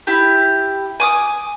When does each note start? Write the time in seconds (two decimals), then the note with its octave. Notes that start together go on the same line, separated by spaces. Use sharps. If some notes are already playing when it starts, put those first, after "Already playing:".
0.07 E4 G4
1.00 G#5 D6 D#6